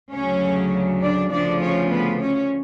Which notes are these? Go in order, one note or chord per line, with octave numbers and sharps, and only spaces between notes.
D2 C#3 F#3 C#4 C#5
D4 D5
D2 C#3 F3 D4 D5
C#4 C#5
B3 B4
C#4 C#5